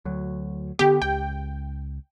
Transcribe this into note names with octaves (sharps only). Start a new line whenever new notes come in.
D2 F#3
D3 B3 G4
C#2 G5